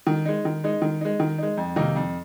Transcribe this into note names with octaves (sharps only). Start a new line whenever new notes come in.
D#3
G#3 D#4
D#3
G#3 D#4
D#3
G#3 D#4
D#3
G#3 D#4
F2
C3 D#3 A#3 D#4
F2